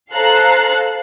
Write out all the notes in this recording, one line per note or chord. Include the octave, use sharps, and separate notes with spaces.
A4 C5 F5 A#5 F#6 C7